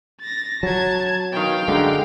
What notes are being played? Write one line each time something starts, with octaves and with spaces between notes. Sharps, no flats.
A6 A#6
F#3 A5 G#6
B2 D#3 F5 G5
F#2 D3 G#3